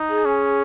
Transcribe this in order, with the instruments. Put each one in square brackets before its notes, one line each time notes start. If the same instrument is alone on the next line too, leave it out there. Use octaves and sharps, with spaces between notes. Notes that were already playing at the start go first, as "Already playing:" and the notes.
Already playing: [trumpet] D#4
[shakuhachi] G#4
[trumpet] C#4